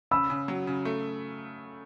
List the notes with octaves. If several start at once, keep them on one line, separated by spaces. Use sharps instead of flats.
C#3 B5 E6
C#3
F#3
C#3
A3